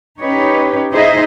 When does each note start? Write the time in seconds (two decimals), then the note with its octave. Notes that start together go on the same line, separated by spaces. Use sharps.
0.21 C#4 D#4 G4 B4 C#5
0.92 D#4 E4 G#4 C5 D#5 E5